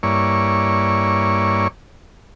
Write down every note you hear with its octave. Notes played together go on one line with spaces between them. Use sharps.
G2 A#3 E4 C#5 D5 C#6